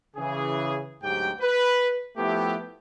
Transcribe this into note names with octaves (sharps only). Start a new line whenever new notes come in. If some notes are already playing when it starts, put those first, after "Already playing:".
C#3 E3 G#4
D2 G#2 F#3 G4 G5
B4
F3 A3 B3 E4 G4